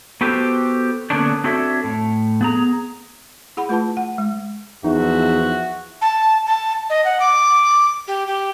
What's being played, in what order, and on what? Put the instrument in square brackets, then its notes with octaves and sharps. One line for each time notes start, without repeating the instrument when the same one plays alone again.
[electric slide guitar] B3 F#4 G4 A4 C5
D3 A#3 B3 C#4 D4
C4 D4 F#4 A4 C#5 E5
A2
B3 G#4 A#5
[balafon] E4 G#4 F#5 B5
A3 F4 B4 A5 B5
F#5
G#3
[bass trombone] E2 [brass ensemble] F3 E5 [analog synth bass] D#4 [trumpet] F#4
[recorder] A5
A5
D#5
F#5
D6
G4
G4